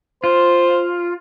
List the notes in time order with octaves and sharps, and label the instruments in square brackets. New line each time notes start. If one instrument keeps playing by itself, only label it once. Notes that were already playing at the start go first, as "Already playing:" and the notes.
[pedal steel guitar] F4 [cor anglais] C5